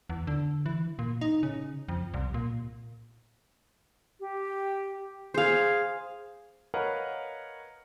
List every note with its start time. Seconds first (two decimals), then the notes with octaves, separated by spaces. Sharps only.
0.10 E2
0.27 D3
0.66 E3
0.99 A#2
1.21 D#4
1.43 C#3
1.88 F2
2.14 C2
2.34 A#2
4.20 G4
5.34 G#4 C5 F5
6.74 A#4 B4 C#5 D#5 F5 F#5